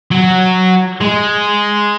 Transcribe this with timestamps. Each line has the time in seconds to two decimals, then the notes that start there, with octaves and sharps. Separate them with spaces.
0.11 F#3
1.01 G#3